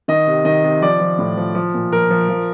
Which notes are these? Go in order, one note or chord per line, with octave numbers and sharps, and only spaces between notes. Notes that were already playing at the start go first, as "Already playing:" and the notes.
D#3 D#5
C3
D#3 D#5
C3
F3 D5
F3
A2
F3
F3
A#2
F3 A#4
F3
F3